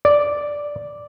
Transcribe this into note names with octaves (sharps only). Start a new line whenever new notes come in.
D5